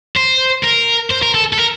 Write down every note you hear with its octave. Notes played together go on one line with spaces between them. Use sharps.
C5
A#4
C5
A#4
A4
A4
A#4